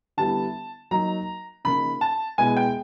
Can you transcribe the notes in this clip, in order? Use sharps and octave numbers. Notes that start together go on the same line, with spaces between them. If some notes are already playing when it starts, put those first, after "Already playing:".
D3 G3 B3 E4 A5
F#3 A#3 D#4 A#5
C#3 F3 A#3 D#4 B5
A5
B2 G#3 B3 E4 G#5
G5